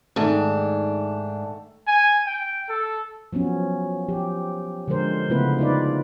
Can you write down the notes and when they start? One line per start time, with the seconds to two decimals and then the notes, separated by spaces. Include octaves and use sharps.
0.16 G#2 D#3 A3 D4
1.87 G#5
2.26 G5
2.69 A4
3.33 F3 F#3 B3 C#4
4.08 F3 G4
4.88 D3 F3 G#3 A#4 C5
5.30 C#3 A3 B3 E4 F4 B4
5.59 D#4 F4 B4 D5